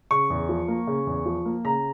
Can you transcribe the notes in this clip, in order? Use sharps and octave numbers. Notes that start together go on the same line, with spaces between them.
C#3 C#6
E2
F3
A#3
C#3
E2
F3
A#3
C#3 A#5